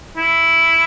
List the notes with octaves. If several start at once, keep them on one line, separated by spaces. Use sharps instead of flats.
E4